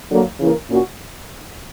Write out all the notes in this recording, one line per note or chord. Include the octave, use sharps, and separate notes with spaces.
D3 F#3 A#3
C#3 E3 A#3 E4 A#4
A#2 A#3 C#4 F#4